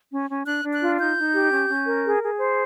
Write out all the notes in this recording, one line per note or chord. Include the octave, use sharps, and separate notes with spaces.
C#4
C#4
D4 F#6
D4
F#6
F4
D#4 G6
D#4
G4
C#4
C#4
A#4
G#4
G#4
C5